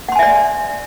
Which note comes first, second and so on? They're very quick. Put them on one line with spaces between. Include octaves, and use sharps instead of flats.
F#5 C6 G#5 E5 D5